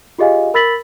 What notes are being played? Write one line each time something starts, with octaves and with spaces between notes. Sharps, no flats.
F4 G4 G#4 D#5 F5 G#5
A#4 B5 E6 A6 B6 F#7